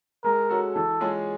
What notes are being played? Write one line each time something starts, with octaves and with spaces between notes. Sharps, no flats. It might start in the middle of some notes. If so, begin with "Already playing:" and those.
G#3 A#4
C#4 F#4 A4
E3 A4
G#3 C#4 F4 G#4